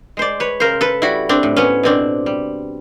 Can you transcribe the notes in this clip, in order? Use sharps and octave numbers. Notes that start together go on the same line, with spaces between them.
G#3 C5 D5
B4 C#5
C#3 A#4 C5
A4 B4
G3 E4 F#4
C4 D4
A2
B3 C#4
B2 C4 D4
G3